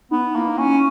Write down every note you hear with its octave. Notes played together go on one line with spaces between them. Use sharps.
B3 D#4
A#3 E4
D#4
C#4